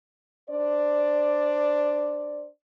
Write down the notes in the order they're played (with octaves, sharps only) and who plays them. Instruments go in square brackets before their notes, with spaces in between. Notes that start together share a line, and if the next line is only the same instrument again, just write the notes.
[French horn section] D4 C5 D5